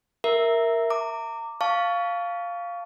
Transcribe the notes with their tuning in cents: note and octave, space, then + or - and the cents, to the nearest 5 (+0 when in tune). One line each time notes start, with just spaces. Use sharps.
A#4 +0 E5 +0
A#5 -30 D6 +0
F5 +0 A5 +0 C#6 +25